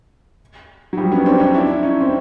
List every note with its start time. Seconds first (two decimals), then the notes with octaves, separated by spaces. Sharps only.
0.93 F#3
0.97 F3 G3
1.12 B3 C#4
1.26 C4 D4
1.40 C#4 D#4
1.54 D4 E4
1.76 E4
1.83 C#4 D#4
2.01 C4